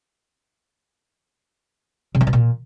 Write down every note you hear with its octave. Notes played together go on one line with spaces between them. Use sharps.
C3
E3
B2
A#2